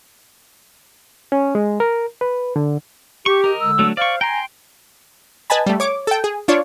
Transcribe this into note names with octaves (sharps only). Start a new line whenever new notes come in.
C#4
G#3
A#4
B4
D3
G4 C#6
A#4 D#5
D3 G#3 E6
F#3 A3 D4
C5 D5 F5 C#6
G5 G#5 A#5 C6
B4 D#5 G#5 A5 B5
G3 A3
C#5 D6
A4 G5
G#4
D4 F4 C#5 D5